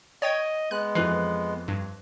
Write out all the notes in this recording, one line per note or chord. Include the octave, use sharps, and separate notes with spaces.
C#5 D#5 G5 G#6
G#3 B3 F#6
F2 E3 F#6 C7
G2